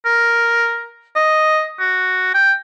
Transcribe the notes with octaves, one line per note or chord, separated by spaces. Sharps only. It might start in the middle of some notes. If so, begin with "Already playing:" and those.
A#4
D#5
F#4
G5